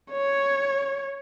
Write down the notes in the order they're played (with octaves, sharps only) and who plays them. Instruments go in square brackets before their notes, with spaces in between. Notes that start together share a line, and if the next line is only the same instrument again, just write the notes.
[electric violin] C#5